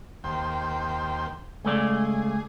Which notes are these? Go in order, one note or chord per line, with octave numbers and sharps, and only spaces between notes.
D#2 C5 G5
C#2 A3 G#4 D5